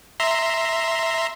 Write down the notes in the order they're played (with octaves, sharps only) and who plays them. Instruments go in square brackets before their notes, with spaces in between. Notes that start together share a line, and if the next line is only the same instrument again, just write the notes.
[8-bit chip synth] E5 A#5 C6